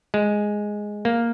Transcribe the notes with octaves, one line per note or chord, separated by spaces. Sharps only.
G#3
A#3